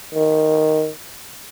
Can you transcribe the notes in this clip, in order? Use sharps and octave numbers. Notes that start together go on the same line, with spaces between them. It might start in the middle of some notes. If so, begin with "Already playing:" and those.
D#3